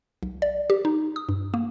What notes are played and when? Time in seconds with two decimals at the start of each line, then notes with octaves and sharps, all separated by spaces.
0.23 B1
0.42 D5
0.70 G4
0.85 D#4
1.16 D#6
1.29 G2
1.54 A#3